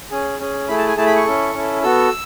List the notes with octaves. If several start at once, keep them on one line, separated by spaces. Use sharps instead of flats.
C#4 G#4
C#4 G#4
A3 E4 G#4 B5
A5
G#5
A3 E4 G#4 A5
B5
C#6
C#4 E4 A4
C#4 E4 A4
B3 F#4 A4 E6